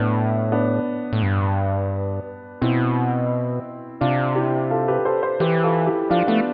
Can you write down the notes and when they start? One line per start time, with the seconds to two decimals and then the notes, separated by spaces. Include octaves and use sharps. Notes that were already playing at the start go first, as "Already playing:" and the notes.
Already playing: A2 B3 D4
0.52 B3 D4
1.13 A2
1.23 G2
2.61 B2 C4 E4
4.01 C3 D4 F4
4.35 E4 G4
4.70 F4 A4
4.88 G4 B4
5.05 A4 C5
5.23 A4 C5
5.40 E3 G4 B4
5.63 F4 A4
5.86 E4 G4
6.10 F3 D4 F4
6.27 A3 B3 D4